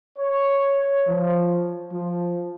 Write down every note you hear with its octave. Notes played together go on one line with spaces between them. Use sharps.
C#5
F3
F3